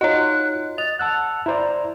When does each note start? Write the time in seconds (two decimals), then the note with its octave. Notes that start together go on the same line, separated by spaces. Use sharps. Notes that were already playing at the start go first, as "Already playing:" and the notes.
0.01 D#4 F4 F#4 C#5 D#5 F#6
0.78 D#5 A6 F7
0.99 F#5 A5 E6 F#6
1.46 E4 C5 D5 A#5